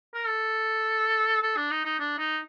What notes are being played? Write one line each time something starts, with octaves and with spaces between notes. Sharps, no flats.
A#4
A4
A4
D4
D#4
D#4
D4
D#4